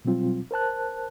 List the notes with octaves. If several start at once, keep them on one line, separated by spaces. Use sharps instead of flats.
B2 F#3 G3 C4 F4
A#4 C5 A5 F#6